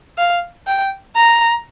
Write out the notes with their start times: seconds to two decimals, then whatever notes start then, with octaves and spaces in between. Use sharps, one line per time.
0.18 F5
0.67 G5
1.16 A#5